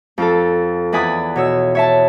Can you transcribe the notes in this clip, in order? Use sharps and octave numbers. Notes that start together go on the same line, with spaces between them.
F2 F4 A4
E2 B4 D5 G#5 B5 D#6
B2 C#5 E6
C#5 E5 A5